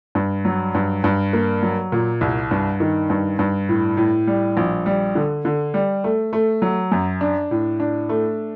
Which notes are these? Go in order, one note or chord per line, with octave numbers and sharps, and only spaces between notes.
G2
F#3
G2
G2
A#3
F#3
A#2
C2
G2
D#3
G2
G2
A2
A2
G3
A#1
G3
D3
D3
G3
A3
A3
F#3
F#2
D4
A2
D4
A3